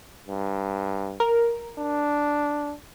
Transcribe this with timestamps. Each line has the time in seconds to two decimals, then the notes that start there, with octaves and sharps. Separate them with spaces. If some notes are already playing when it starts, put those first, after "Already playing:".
0.28 G2
1.20 A#4
1.79 D4